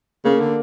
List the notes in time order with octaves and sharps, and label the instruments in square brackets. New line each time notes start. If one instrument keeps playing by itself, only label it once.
[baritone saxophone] C#3 [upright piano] A#3
[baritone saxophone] D3